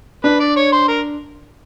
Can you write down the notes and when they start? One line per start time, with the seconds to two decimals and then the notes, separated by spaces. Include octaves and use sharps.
0.24 D4 B4
0.40 D5
0.57 C#5
0.72 C5
0.88 A#4